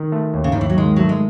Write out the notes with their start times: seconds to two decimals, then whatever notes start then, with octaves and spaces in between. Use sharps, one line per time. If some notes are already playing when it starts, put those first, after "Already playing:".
Already playing: D#3
0.12 A3
0.34 D#2
0.44 C#3
0.52 D#2 D#3
0.61 E3
0.70 F#3
0.77 D#3 G#3
0.96 F#3 A3
1.09 G#3